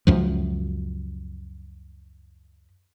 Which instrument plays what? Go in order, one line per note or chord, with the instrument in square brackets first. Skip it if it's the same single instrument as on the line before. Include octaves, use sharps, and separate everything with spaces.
[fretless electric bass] C#2 F#2 F3